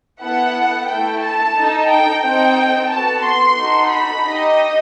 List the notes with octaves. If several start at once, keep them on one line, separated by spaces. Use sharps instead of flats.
B3 E4 A4 F#5
A3 E4 A4 G5
A5
D#4 A4
G5
C4 D#4 A4 G5
B3 F#4 A4 A5
C6
D#4 F#4 A4
B5
D#4 G4 D#5